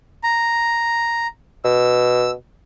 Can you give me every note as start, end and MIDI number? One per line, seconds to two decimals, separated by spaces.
0.24 1.27 82
1.65 2.33 47
1.65 2.31 88